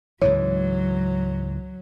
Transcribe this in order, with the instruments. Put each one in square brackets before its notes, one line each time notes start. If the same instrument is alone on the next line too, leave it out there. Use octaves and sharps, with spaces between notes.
[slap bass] C#2 G#2 E3 [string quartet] F#3 [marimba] C#5